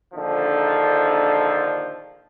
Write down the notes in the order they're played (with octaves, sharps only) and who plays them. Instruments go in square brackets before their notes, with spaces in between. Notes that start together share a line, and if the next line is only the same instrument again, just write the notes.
[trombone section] A#1 D3 D#3 F3 D#4 A4